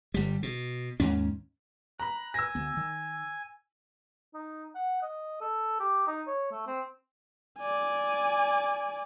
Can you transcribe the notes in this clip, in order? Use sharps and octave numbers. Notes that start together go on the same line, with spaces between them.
G1 G3
B2
D#2 G#2 C#4
A#5 B5 F#6
G#5 E6 A#6
D2 B3
D#3
D#4
F#5
D#5
A4
G4
D#4
C#5
A3
C4
D5 G#5